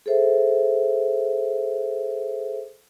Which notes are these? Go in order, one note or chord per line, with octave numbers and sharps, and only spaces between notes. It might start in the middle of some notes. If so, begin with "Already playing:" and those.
G#4 A4 C5 E5